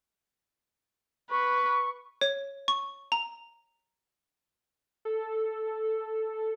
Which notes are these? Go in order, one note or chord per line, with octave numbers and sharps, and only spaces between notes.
B4 C#6
C#5
C#6
A#5
A4